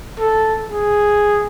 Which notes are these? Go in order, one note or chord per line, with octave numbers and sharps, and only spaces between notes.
A4
G#4